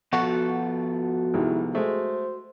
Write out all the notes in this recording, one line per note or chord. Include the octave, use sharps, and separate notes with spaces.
F3 B3 F#4 A4
C2 D#3 G#3 E4
G#3 A3 C5